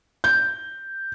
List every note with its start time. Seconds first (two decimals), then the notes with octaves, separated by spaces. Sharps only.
0.24 G6